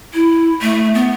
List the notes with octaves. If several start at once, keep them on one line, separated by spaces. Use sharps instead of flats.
E4
A3
B3